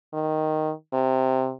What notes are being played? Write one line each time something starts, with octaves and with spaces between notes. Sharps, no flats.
D#3
C3